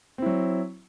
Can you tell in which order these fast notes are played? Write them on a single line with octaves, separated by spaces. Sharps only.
C4 E4 F#3